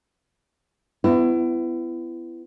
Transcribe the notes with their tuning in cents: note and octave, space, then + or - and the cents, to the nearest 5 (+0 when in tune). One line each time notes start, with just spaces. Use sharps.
B3 +30 E4 +30